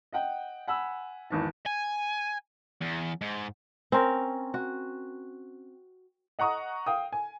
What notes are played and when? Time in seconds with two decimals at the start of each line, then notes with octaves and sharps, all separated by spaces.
0.13 D#5 F#5 G5
0.68 F#5 G#5 B5 E6
1.30 G#1 E2 A5
1.66 G#5
2.81 E2
3.21 G#2
3.92 C4 C#4 A#4
4.54 F#4
6.39 D#5 F#5 A#5 C#6 D#6
6.86 F5 G5 D#6
7.13 G#5